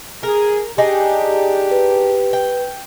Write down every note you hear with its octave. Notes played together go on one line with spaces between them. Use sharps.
G#4 A#4
D4 D#4 G4 G#4
B4
G5